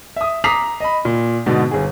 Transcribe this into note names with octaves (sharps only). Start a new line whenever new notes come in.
E5 D#6
A#5 D6 D#6 B6 C7 F7
D#5 B5
A#2
G#2 B2 D3
G1 G#4